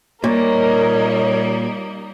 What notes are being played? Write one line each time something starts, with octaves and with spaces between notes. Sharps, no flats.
A#2 G3 A#3 D#4 A#4 C#5 D#5